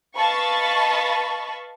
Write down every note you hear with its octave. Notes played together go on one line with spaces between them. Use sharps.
B4 D#5 F5 A5 B5 C#6